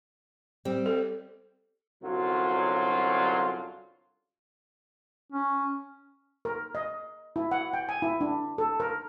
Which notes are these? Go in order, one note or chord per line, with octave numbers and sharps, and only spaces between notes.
G3 C4
A4
C2 F#2 D3 F#3 F4
C#4
A#4
D#5
E4
F#5
G5
G#5
E4
D4
A4
A#4